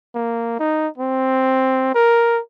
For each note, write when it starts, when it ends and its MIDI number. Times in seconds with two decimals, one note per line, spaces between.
0.15 0.56 58
0.60 0.88 63
0.98 1.92 60
1.95 2.40 70